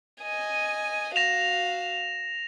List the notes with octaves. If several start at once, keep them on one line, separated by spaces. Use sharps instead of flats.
D#5 G#5
F#4 F5 A#6 E7 F7